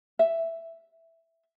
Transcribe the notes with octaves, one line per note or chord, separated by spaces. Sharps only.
E5